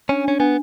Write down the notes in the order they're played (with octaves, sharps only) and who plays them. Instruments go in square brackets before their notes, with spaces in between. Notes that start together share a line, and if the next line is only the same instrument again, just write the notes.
[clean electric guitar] C#4 [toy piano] D4
[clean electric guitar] C#4 [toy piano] D4
[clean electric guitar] B3 [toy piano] D4